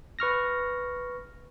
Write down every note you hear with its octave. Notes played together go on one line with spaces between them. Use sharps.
B4 C#6 F6 A#6